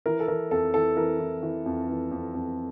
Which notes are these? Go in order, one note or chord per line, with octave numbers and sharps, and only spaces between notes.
E3 A#4
A4
E3 A#4
F2 A4
E3 A4
E3 A#4
E3
E3
F2
E3
F2
F2